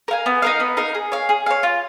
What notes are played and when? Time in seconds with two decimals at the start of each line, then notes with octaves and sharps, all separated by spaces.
0.08 A#4 F5 G#5
0.26 B3
0.42 D#4 A#4 F5
0.60 B3
0.77 D#4 A#4 F5
0.95 G#4
1.12 C#5 F5
1.29 G#4
1.46 C#5 F5
1.63 F4